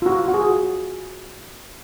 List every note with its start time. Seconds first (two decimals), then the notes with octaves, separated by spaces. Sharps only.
0.02 F4
0.06 F#4
0.28 F#4
0.34 G#4